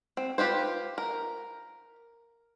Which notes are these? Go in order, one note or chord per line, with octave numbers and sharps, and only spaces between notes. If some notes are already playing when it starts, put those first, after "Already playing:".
C4
F4 G4 B4 C5
A#4